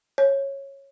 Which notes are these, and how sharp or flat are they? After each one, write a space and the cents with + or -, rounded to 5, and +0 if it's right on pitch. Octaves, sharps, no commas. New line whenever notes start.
C#5 -15